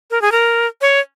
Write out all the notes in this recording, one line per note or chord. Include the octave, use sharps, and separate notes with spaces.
A#4
G#4
A#4
C#5